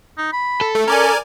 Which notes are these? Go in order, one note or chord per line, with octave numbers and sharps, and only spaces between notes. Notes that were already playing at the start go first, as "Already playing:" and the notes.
D#4
B5
A4
A3
C#4 A#4 D5 G#5